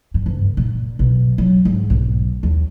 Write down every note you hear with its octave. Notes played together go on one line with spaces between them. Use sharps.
G2
F#1
A#2
B1
F#3
G#2
B1
D#2